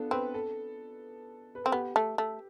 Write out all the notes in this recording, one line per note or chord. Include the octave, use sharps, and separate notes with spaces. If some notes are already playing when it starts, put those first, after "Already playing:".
Already playing: B3 D4 F4 A4
C4 B4
A4
B4
C4 A4
B3 G4
A3
A3